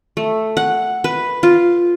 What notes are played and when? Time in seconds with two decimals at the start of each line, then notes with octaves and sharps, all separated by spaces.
0.17 A3
0.57 F#5
1.04 B4
1.43 F4